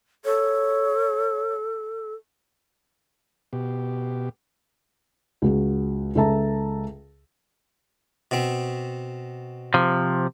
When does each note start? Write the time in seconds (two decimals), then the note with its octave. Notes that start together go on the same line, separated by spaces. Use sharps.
0.25 A4 C#5
3.53 B2 G4
5.42 C#2 F#4 G#4
6.15 C#2 A4 E5 A5 A#5
8.31 B2 C4
9.74 C3 F3